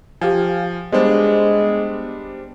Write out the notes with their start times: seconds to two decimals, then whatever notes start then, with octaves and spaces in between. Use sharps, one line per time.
0.21 F3 G4 F5 G#5
0.92 G3 G#3 B3 D4 C5